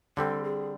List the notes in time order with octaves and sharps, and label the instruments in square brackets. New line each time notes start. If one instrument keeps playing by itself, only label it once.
[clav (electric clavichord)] D3 G3 C4 [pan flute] A4
[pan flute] G#4